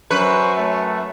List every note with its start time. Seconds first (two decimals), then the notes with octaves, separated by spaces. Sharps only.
0.11 F#2 B4 C5 C#6
0.56 A3